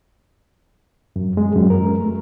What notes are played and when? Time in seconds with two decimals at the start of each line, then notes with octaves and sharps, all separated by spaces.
1.16 F#2
1.37 G#3
1.56 F#2
1.70 A#4
2.00 A3